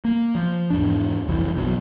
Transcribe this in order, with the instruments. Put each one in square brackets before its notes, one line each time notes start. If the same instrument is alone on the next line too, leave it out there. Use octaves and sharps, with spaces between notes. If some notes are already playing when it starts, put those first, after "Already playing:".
[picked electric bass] A#3
F3
E2 G#2 D4
F#1 C2 F2 E3
A#1 B2 D#3 F#3